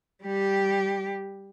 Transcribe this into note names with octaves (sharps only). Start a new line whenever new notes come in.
G3 G4